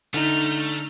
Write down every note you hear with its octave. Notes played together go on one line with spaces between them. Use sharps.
D3 A3 D#4 F6 G6